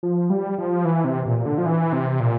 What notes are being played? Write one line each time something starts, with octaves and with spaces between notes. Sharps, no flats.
F3
G3
F3
E3
C3
A#2
D3
F3
E3
C3
A#2